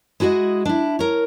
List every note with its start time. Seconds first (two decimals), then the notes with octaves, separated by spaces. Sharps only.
0.20 G#3 E4 F#4 G#4 D#5
0.65 D4 E4
0.99 A#4 C#5